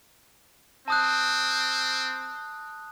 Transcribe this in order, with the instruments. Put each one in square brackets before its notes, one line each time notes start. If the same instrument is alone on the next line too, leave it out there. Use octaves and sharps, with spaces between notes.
[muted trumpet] C4 [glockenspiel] A5 D#6 F#6